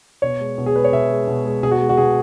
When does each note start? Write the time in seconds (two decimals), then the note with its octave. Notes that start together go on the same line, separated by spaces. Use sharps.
0.22 B2 C#5
0.40 G#3
0.58 B2
0.66 G#4
0.75 G#3 B4
0.84 C#5
0.92 B2 E5
1.10 G#3
1.27 B2
1.45 G#3
1.63 B2 G#4
1.71 F#4
1.80 G#3
1.89 F#4
1.97 B2 G#4